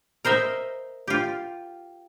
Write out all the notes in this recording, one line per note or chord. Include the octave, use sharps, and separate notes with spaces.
A#4 C5 D#5 E5
F4 G4